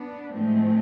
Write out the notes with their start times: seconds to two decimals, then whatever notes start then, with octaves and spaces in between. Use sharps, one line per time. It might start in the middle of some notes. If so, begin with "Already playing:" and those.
Already playing: B3 D4
0.34 A2 F3 G#3 A3 C4